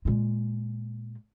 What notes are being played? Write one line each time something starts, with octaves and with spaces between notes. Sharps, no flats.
A#2 G#3